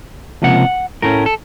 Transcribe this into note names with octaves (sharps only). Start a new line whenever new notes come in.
C#2 C3 F3 A#3 F#5
A2 A3 C#4 A#4
A4